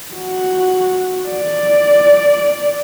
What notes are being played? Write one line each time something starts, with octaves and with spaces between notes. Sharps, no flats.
F#4
D5